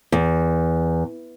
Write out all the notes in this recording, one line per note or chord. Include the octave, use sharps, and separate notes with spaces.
E2